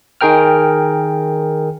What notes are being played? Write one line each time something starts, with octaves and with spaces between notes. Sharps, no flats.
D#3 G#4 A#4 G5 F6